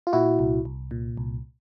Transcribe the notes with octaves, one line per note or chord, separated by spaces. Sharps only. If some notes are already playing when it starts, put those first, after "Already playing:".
F4
A#2 E4 F#4
C2
C2
A#2
C2